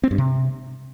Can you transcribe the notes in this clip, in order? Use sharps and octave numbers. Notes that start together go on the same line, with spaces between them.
C4
G2
C3